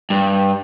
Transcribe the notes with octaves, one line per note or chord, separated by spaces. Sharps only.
G2